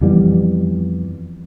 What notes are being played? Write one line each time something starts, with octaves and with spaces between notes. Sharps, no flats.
F2 E3 G3 B3